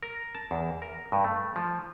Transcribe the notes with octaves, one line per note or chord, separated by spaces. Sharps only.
A#4
A5
E2
A#4
G2
A3
F3